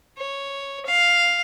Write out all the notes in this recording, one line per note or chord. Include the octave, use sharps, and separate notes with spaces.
C#5
F5